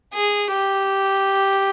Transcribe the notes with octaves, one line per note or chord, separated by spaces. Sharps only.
G#4
G4